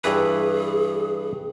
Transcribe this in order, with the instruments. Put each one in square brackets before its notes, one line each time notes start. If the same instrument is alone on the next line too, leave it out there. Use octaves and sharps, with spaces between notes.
[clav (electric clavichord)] G2 E3 B4 [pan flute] G#4